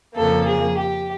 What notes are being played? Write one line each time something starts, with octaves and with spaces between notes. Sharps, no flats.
F2 C#3 F3 A#3 A4
G#4
G4